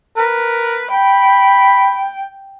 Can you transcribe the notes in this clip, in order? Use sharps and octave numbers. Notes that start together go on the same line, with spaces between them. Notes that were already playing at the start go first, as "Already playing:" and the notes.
A#4 B4
G5 B5